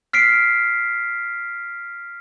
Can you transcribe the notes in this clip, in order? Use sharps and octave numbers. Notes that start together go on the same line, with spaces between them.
F6 B6 C7 D7